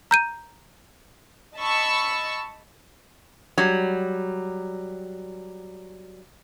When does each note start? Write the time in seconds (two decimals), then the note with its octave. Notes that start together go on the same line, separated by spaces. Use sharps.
0.11 A#5 G6 D#7
1.57 D#5 A5 B5 C#6 E6
3.58 F#3 G3